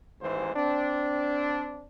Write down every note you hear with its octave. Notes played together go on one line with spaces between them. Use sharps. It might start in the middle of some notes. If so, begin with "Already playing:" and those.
A1 D#2 G#2 E3 C5
C4 D4